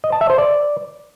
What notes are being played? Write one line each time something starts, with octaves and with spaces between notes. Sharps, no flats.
D#5
A5
E5
C5
D5